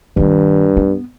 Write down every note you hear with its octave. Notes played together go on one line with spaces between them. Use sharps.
G2 D#3 G3
B3